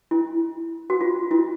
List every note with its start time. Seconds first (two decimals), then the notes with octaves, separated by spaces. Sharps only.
0.11 E4
0.90 F#4
1.01 F4
1.31 E4